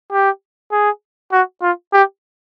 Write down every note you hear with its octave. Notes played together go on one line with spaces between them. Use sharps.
G4
G#4
F#4
F4
G4